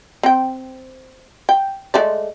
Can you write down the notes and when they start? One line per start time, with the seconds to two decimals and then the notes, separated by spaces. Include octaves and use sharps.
0.23 C4 G5
1.49 G5
1.94 G#3 A3 D5